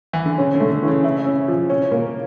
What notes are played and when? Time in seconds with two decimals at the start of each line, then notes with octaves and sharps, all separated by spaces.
0.13 E3
0.26 D3
0.38 C#3 C#4
0.55 D3
0.60 A3
0.72 D3
0.83 E3
0.88 C#3
1.04 E4
1.26 C#4
1.48 F3
1.70 C#4
1.92 A#3